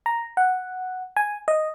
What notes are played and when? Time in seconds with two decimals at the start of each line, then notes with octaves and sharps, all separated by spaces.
0.06 A#5
0.37 F#5
1.17 G#5
1.48 D#5